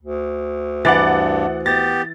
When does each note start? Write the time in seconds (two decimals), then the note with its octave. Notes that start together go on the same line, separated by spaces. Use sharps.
0.03 D2
0.85 G2 E3 F#5 D6 A6
1.66 B3 G4 A6 A#6